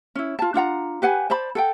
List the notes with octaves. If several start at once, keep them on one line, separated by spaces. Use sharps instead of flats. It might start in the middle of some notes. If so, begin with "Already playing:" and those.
C#4 E4
F4 A5
D4 F4 F#5 A#5
G4 B4 F#5 G#5
C5 D5 A5 B5
A4 F#5 G5